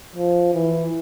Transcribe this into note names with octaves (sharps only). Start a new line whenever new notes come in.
F3
E3